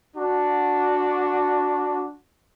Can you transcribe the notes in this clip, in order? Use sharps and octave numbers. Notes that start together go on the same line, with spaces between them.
D4 F#4